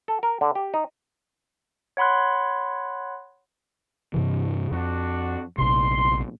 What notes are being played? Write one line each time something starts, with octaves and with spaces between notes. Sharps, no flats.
A4
A#4
D3
G4
D#4
C#5 F#5 B5 C6 F#6
G2 C3 E3
F2 D4 F#4
A#1 C3 C6